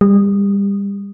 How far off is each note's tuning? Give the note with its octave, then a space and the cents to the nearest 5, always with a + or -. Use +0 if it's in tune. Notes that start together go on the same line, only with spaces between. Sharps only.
G3 +30